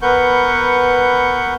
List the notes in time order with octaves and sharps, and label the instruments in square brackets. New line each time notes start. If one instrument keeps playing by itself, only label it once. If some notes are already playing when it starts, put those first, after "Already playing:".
[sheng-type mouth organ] B3 A#4 B4 F#5 C#6 G6